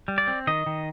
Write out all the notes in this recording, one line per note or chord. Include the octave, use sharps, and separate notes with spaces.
G3
D5
C4
D#3 D#5
D#3